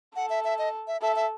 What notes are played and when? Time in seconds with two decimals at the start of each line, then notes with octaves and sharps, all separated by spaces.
0.16 A4 F#5
0.30 E5
0.44 E5
0.58 D#5
0.87 E5
1.02 A4 E5
1.16 E5